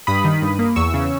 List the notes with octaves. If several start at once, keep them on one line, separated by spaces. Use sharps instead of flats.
G2 B5 D#6
D#3
G2
A#3
E2 C#6 E6
C#3